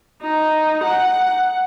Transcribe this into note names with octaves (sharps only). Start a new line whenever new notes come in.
D#4
F#5